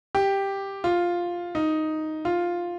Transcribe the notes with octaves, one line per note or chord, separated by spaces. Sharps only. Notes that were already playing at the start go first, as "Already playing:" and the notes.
G4
F4
D#4
F4